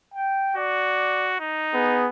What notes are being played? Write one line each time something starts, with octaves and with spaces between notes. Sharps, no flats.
G5
F#4 D5
D#4
B3 G#4